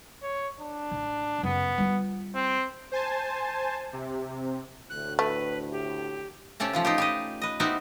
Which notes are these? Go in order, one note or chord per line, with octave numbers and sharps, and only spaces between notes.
C#5
D4
A1
F#2 C#3 B3
G3 F4
C4
C5 G#5 A5
C3
D2 A2 F#6
A3 B4
G4
C3 A3 C#4 G4 A4
F3 C#4 F4
D#4 F4 G4
G4 B4 D#5
B4 D#5
B3 C4 D#4 E4 F#4 G4